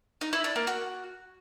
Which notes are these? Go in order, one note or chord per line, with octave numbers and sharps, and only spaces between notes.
D#4
E4
D4
A#3
F#4